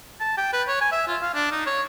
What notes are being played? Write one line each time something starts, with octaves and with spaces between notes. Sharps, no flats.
A5
G5
B4
C#5
G#5
E5
F4
F5
D4
D#4
C#5